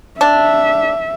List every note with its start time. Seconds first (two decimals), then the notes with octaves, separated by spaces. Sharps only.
0.21 D4 E5